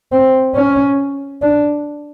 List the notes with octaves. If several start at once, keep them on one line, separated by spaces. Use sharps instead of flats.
C4
C#4
D4